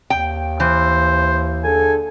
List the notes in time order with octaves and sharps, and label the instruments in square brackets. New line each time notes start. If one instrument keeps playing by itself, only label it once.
[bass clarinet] D#2 [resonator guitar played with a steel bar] G5
[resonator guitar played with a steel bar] E3 [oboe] C5
[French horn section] D3 G#4 A4 [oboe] G#5